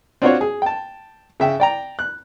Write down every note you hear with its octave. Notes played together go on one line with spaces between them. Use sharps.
C4 D4 F4 F#4 C5 C#5
G#4
G5 A5
C#3 E5 G5
D5 G5 A#5
F#6